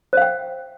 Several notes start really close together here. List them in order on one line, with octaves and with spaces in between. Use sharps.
C5 F5 G5